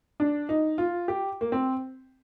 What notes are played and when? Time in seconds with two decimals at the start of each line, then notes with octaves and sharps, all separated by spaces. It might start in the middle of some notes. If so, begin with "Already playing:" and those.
0.20 D4
0.49 D#4
0.78 F4
1.08 G4
1.41 A#3
1.52 C4